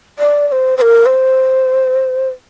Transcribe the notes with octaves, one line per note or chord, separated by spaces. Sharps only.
D5
D5
C5
C5
A#4
C5